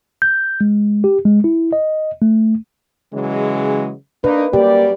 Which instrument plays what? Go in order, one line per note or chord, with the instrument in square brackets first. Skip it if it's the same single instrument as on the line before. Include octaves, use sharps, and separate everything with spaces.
[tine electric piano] G6
G#3
G4
G#3
E4
D#5
A3
[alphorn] C#3 [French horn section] E3 F#3 G#3
[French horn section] A#3 D#4 [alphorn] D4 [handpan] B4
[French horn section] F#2 G3 D5 [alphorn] A#3 [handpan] G4